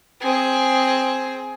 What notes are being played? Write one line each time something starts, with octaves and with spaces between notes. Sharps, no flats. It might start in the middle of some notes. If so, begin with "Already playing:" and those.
C4 G#4